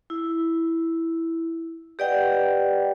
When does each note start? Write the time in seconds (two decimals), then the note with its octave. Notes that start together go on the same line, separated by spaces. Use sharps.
0.10 E4
1.99 G4 B4 D5 D#5 F#5 G5